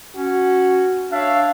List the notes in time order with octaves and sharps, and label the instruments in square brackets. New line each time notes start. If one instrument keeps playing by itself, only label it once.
[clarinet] C#4 [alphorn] F#4
[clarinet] D4 [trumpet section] C#5 E5 F5